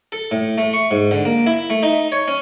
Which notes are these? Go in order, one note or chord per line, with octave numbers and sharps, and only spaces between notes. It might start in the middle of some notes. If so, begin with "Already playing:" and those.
A4
A2
A3
C#6
G#2
D3
A#3
E4
A3
D#4
C#5
C#4